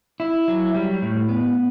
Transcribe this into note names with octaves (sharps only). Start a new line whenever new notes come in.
E4
F#3
G3
A2
B3